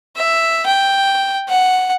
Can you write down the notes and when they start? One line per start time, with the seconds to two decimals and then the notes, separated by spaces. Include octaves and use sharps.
0.16 E5
0.66 G5
1.48 F#5